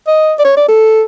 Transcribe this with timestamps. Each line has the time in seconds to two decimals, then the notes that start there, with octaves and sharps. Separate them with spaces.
0.07 D#5
0.39 D5
0.45 C#5
0.57 D5
0.68 A4